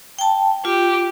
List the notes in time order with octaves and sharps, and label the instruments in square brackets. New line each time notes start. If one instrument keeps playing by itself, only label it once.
[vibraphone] G5 A5
[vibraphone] F4 [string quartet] G4